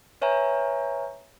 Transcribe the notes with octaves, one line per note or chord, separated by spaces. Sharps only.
B4 C#5 E5 G#5 A#5